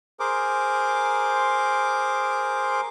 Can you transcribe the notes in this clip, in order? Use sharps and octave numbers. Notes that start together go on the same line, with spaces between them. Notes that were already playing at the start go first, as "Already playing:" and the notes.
G#4 A#4 C5 D6